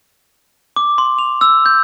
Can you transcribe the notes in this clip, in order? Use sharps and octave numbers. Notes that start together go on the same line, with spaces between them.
D6
C6
F7
E6
G6